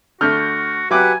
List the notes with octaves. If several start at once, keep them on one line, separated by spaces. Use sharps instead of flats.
D3 A3 F#4 F6 G6
F#3 G4 B4 E5 F#5 G#5 D6 F#6